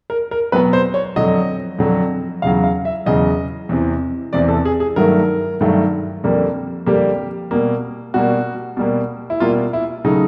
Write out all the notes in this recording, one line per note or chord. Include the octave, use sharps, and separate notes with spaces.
A#4
A#4
B2 F#3 B3 B4
C5
C#5
F2 D3 F#3 D#5
F2 D3 F#3
E2 C#3 F#3 F5
F5
E5
E2 C#3 F#3 D#5
E2 C3 E3
E2 C3 E3 D5
A4
G#4
G#4
G2 D#3 F#3 A3 A#4
G2 D#3 F#3 A3
F2 D3 G3 A#3
F2 D3 G3 A#3 G4
B2 G3 A#3
B2 G3 A#3 F#4
B2 G3 A#3
E4
B2 G3 A#3 F4
E4
C#3 F#3 A3 D#4